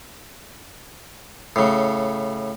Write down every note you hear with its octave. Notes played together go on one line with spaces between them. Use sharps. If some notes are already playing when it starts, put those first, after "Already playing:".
A2 C#3